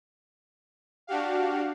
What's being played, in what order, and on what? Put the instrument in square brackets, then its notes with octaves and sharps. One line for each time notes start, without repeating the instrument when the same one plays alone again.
[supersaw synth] D4 F#4 G4 F5